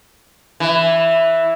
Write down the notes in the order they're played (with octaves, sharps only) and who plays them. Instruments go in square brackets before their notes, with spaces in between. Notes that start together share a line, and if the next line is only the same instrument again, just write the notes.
[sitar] E3